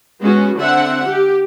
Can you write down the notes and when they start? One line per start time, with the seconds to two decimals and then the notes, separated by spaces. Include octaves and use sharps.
0.22 G#3 B3 C#4 F#4
0.57 D3 C4 E5 F#5
1.06 G4